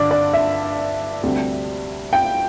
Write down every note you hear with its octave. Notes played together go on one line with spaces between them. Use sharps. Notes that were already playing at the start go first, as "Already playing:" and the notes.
Already playing: G2 D3 D5
D5
E5
D2 C3 G3
G5